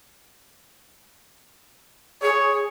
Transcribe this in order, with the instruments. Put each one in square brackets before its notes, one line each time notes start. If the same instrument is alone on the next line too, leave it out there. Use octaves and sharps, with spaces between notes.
[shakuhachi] G#4 [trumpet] C#5